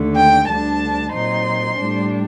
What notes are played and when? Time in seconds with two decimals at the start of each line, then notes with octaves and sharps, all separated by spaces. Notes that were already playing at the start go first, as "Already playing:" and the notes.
Already playing: D#2 D3 A3
0.14 G5
0.47 D2 D3 G3 D4 A5
1.12 A#2 F#3 C4 D#4 C6
1.77 A2 G3 D4